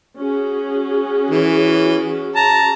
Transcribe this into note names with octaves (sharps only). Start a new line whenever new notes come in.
C#4 F#4 G#4
E3
A5 A#5